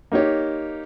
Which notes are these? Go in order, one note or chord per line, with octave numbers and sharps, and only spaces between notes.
A#3 D#4 G4 C#5